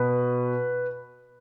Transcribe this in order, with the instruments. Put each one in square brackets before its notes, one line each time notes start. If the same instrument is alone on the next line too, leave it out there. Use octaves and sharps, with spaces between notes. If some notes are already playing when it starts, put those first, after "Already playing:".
Already playing: [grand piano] B2 B4